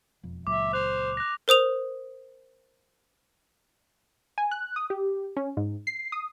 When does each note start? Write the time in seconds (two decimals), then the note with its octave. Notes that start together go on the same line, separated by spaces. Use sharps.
0.23 E1 F2
0.47 C#2 A#2 F#3 E5 D6
0.73 C5 F#6 F7
1.17 F#6 A#6
1.48 A#4 C5 D#6 F7
4.38 G#5
4.51 F#6
4.76 D#6
4.90 G4
5.37 C#4
5.57 G#2
5.87 C7
6.12 D#6